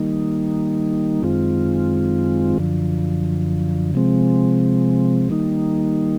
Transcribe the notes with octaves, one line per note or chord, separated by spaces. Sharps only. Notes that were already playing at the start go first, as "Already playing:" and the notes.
Already playing: D#3 G3 A#3 D#4
F#2 D#3 G#3 C4 F4
F#2 D3 F3
C3 F3 G#3 C4
D#3 G3 A#3 D#4